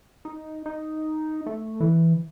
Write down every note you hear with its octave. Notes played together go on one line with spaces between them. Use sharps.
D#4
D#4
A3
E3